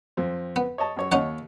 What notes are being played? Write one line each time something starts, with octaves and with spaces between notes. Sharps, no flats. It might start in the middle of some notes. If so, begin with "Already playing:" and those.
F2 C4
B3
C#5 D#5 A5
F#2 C#5
D#2 C#4 D#4 C#5 F#5